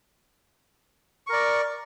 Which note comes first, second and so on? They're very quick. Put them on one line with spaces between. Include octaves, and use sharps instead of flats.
C#6 A#4 D5